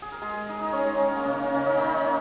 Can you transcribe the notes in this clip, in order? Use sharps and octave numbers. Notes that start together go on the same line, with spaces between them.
G#4
A#4
G#3 G#4
D#4 D#5
D#4 D#5
C#4 C#5
G#3 G#4
D#3 D#4
C#4
A#3
C#3 C#4
A#3
C#3 C#4
D#3 D#4
D#3 D#4
C#4